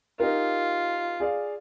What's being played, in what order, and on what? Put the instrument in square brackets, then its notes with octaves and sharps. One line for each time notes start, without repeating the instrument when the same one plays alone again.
[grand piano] D#4 G4 A#4 [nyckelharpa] F4
[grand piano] G#4 D5 F5